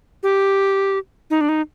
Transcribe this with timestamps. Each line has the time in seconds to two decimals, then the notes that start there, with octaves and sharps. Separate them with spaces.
0.23 G4
1.30 D#4
1.41 D4
1.49 D#4